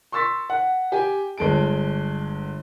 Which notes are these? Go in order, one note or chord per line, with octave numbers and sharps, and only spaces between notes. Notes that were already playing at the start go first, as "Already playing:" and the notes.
C6 C#6 E6 A6 B6
F#5
G4 G5 G#5
G1 G#3 A5 D7